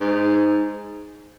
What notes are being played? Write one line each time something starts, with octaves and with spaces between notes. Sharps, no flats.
G#2